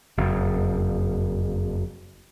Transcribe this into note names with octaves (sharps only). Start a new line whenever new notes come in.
F#1 F2